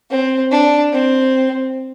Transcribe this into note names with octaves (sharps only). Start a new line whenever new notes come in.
C4
D4
C4